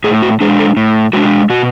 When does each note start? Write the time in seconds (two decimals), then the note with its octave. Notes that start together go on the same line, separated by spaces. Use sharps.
0.04 A2 G#4
0.22 F#4
0.41 G#3 D4 G#4
0.59 A4
0.77 A2
1.13 G#3 D4 F#4
1.50 B2 F#4